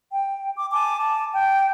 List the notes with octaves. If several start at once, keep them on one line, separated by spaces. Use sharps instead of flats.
G5
D6
G#5 A5 D6
A5
G5